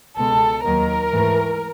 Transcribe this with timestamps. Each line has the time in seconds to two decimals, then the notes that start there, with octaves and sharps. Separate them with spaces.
0.18 C#2 B2 G#3 A4
0.65 D#2 D#3 F#3 A#3 A#4
1.13 G#2 E3 A3